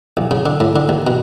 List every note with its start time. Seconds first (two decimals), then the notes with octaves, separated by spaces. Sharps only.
0.17 B1
0.31 C#3
0.46 D3
0.60 A2
0.76 D3
0.89 D#2
1.07 B2